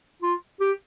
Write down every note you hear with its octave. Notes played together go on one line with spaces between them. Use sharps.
F4
G4